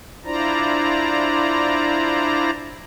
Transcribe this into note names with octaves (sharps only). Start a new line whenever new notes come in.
D4 E4 F4 C5 D5 A#5